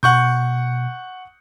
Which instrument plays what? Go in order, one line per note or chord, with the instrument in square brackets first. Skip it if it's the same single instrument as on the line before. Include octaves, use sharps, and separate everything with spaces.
[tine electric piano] B2 [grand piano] F#5 C#6 G6